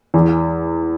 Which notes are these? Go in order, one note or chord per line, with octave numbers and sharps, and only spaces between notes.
E2